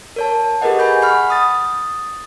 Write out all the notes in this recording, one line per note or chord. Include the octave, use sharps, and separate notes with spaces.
A#4 C#5 A5
G4 G#4 A#4 B4 D#5 F#5
G#5 B5 G6
F#5 B5 C#6 F6
D#6 A6